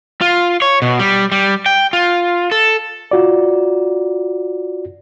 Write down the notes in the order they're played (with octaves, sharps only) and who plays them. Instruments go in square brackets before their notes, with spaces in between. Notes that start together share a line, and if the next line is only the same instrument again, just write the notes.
[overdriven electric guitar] F4
C#5
B2
G3
G3
G5
F4
A4
[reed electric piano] F4 F#4 D5